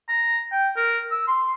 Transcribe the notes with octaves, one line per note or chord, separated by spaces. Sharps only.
A#5
G5
A#4
E6
C6